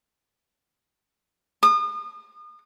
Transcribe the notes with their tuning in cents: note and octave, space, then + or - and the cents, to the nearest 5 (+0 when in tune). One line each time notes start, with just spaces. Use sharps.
D#6 -40